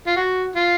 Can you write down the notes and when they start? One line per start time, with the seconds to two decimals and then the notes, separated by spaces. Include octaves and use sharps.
0.07 F4
0.17 F#4
0.56 F4